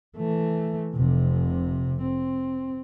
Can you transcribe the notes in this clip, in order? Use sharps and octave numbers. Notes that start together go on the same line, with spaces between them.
E3 A3
F1 C3
C4